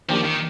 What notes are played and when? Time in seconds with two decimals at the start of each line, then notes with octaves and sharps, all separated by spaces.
0.09 D#3 F3 A#3 D4 G4
0.25 D#3